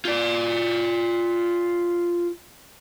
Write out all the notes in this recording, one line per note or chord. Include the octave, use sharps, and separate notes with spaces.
F4 D5